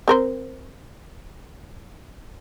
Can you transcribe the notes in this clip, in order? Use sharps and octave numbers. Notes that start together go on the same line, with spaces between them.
C4 A#4 C5